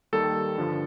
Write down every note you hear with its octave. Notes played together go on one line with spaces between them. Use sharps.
D#2 D#3 G3 A4
G2 D3 F3